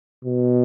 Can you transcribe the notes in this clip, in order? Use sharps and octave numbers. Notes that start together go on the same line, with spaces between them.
B2